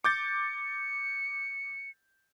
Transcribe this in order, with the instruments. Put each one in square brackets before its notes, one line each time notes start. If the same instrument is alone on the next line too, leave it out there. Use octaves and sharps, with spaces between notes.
[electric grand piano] D6 G6 A6 [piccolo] C#7